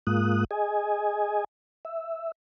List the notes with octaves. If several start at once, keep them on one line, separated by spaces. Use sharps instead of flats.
G#2 G#3 A#3 F4 D#6 F#6
G#4 D#5 G#5
E5